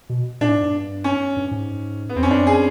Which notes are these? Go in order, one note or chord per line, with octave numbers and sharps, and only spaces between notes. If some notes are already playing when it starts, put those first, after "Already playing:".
B2
A#2 D4
A2
G#2
G2
C#4
G2
G#2
B3
E2 C4
F2 C#4
F#2 D4
G#4